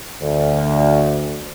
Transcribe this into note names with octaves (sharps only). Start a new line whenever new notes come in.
D2